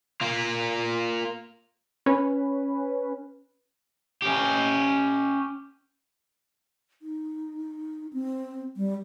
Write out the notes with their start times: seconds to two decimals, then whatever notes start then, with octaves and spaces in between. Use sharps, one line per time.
0.21 A#3 F4
2.06 C#4 B4
4.22 C#4 G4
7.02 D#4
8.13 C4
8.76 G3